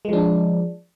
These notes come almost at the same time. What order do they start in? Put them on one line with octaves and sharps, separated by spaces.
G#3 F3 D4